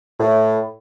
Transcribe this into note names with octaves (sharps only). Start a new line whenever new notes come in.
A2